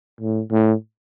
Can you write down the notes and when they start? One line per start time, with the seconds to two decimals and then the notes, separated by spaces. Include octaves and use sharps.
0.20 A2
0.51 A2